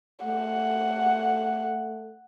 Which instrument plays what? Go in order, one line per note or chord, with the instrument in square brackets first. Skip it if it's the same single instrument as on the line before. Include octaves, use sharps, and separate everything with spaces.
[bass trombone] A3 [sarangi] F#5